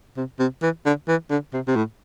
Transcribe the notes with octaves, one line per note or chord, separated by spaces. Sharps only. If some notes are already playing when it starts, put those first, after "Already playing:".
C3
C3
E3
D3
E3
D3
C3
C3
A2